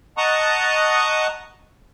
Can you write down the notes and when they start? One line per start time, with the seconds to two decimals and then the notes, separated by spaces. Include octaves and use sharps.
0.17 D#5 F#5 A5 A#5 C#6 D#6